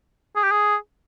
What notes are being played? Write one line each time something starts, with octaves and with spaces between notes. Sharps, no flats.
G#4
G4
G#4